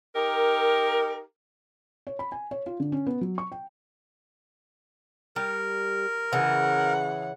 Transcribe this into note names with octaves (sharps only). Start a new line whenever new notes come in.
D#4 G4 A#4
C#5
B5
G#5
C#5
F4
D3
C#4
B3
F#3
C#6
G5
G3 A#4
C#3 E3 F#5